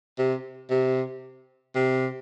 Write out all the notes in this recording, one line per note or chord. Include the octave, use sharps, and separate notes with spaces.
C3
C3
C3